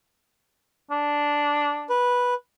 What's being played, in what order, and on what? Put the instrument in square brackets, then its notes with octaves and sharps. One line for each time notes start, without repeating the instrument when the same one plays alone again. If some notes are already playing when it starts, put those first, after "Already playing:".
[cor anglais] D4
[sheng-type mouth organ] B4